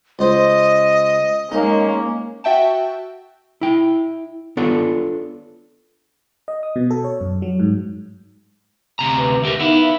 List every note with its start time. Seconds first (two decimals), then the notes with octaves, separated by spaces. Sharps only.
0.19 C#2 C5 D#5
1.52 G#3 A#3 C#4 D#4
2.44 F#4 E5 G5 A5
3.61 E4 G5
4.57 B3 D4 F4 A4 C#5
6.48 D#5
6.63 D#6
6.76 B2
6.91 A4
7.04 C#5
7.21 F#2
7.42 F#3
7.60 G#2
8.99 D2 C3 A#5
9.18 B4
9.43 D2 G4 A#4 E5
9.60 B3 D#4 E4 E5 F5